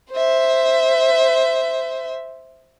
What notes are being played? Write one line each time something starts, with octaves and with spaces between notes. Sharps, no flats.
C5 E5